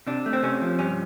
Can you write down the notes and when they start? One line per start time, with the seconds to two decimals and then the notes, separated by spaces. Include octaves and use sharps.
0.07 C3 D4
0.26 A3
0.33 C4
0.43 C3 C#4
0.61 F3
0.79 G2 C#4